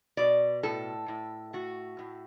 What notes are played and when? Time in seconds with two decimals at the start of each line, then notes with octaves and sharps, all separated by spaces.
0.17 B2 D5
0.63 A2 A4
1.08 A2
1.53 A3 F#4
1.99 A2